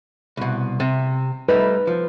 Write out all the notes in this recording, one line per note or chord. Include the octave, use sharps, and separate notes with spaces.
C2 B2
C3
G3 A3 D#4 B4
F3